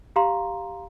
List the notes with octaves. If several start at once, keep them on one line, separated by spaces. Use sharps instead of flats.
G4 F5 A#5 C6